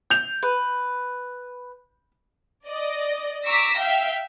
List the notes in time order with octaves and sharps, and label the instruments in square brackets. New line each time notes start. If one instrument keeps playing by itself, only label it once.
[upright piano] G6 F7
[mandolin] B4
[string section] D5 D#5
A#5 C#6 D6 E6 A#6 B6
E5 F5 G5 B6